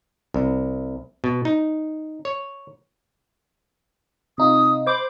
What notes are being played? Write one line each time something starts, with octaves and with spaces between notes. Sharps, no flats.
C2
B2
D#4
C#5
C3 D#4 F4 D#6
C5 B5 D6